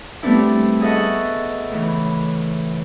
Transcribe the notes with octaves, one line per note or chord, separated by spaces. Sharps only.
G3 A3 B3 C4 D4 E4
G#4 A4 D#5 E5 F#5 C#6
A2 C#3 E3